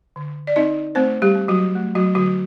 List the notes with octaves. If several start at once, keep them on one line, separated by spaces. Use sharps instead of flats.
D3
D5
C4 D#4 D#5
A3 C4 C5
G3 G4
C4
F#3 F#4
A3
F#3 F#4
D3 F#3 F#4